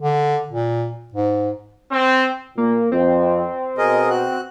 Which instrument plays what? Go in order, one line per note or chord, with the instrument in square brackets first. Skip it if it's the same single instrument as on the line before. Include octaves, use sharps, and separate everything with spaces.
[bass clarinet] D3
A#2
G#2
[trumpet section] C4
[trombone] A#2 [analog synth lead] A#3
[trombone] F2 [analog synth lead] C4
[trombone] B2 [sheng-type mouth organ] G#4 A#4 D#5
[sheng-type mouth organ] F#4 F#6